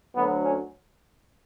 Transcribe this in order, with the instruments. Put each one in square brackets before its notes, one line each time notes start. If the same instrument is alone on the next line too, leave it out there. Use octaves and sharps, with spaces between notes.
[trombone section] D2 D3 F#3 B3
C#4